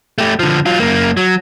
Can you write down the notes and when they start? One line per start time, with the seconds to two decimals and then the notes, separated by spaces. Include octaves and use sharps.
0.18 A3 G4
0.39 D3 F3
0.66 F#3 F4
0.80 F#2 A#3
1.17 F#3